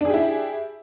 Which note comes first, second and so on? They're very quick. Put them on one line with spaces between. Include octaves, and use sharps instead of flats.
D4 G#4 G4 E4